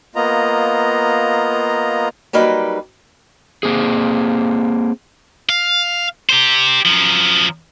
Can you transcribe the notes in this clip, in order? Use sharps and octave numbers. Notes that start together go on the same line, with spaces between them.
A#3 B3 F4 D#5 A#5
F#3 G3 A#3 D#4 B4
A#3 C4 G#4
F5
G4 C5
F#2 F3